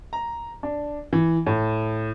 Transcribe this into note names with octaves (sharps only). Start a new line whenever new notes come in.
A#5
D4
E3
A2